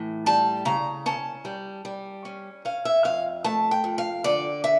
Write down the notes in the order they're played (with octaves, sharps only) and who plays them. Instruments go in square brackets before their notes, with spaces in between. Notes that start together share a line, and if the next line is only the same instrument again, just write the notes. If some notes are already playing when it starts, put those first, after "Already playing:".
Already playing: [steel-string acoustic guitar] A2 E3
G3 A5
C#3 A#5
C#4 A5
G3
G3
C#4
C#4 F5
E5
F2 F5
A3 A5
G5
F2
F5
D3 D5
E5